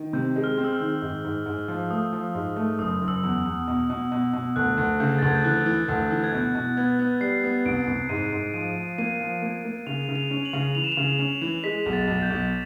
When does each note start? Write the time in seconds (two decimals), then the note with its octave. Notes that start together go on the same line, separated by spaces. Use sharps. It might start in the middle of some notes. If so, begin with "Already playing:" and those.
Already playing: D#3
0.13 C3 G6
0.36 G#3
0.44 F6
0.57 C4
0.64 E6
0.73 F6
0.80 D#3
1.02 G#2
1.24 G#2
1.46 G#2
1.68 F3
1.90 A3 D#6
2.13 F3
2.35 G#2
2.56 A3
2.79 F#1 D#6
3.02 F#1
3.08 E6
3.23 E2
3.45 E2
3.68 B2
3.90 B2
4.12 B2
4.33 B2
4.56 D2 F#6
4.77 D2
5.00 C#3 G6
5.19 A6
5.22 D2 G#6
5.35 G6
5.44 E3 F#6
5.66 E3
5.88 D2
6.11 E3
6.24 G#6
6.33 B2 G6
6.55 B2
6.77 B3 G#6
6.99 B3
7.21 G3 C7
7.44 B3
7.66 C2 D7
7.88 C2
8.09 G#2 D#7
8.32 G#2
8.54 F3 D#7
8.76 F3
8.98 A#3 D#7
9.21 F3
9.42 A#3
9.65 A#3
9.87 C#3 F7
10.09 C#3
10.15 F7
10.31 C#4
10.45 F#7
10.53 C#3
10.75 E3 F7
10.84 E7
10.92 F7
10.97 C#3
11.19 C#4 F7
11.41 E3
11.64 G#3 B6
11.86 B1
11.93 A6
12.07 B1
12.23 G6
12.30 B1